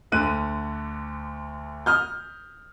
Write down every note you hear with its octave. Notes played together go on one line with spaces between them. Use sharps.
D2 D3 F#6 D#7
D#6 F6 G6